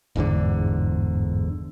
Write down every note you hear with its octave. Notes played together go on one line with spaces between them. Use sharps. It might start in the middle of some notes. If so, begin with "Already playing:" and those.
G1 E2 G#2 D3